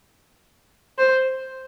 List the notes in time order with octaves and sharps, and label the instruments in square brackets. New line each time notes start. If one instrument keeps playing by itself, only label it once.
[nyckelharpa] C5